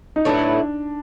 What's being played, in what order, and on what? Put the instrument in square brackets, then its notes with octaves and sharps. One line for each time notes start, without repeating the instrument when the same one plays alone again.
[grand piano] D#4
[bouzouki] A2 F#3 B3 E4 [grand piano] D4